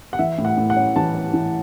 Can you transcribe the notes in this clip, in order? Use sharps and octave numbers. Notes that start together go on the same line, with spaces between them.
F#5
E3 E5
A2
F#5
A2
F#5
C#4
E3 A5
C#4
E3